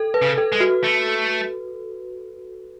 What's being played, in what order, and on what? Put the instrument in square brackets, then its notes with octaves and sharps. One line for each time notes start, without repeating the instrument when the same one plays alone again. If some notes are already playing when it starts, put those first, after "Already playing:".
Already playing: [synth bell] A4
B4
[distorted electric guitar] C#3
[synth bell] A4
[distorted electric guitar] G#3
[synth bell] F#4
[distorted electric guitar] A3